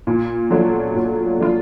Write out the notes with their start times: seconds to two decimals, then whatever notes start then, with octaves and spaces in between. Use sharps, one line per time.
0.07 A#2
0.51 F#3 A3 D4 F4
0.95 A#2
1.39 F#3 A3 D4 F4